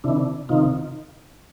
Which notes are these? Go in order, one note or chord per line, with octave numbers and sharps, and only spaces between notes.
C3 D#3 D4 E4
C3 D#3 D#4 F4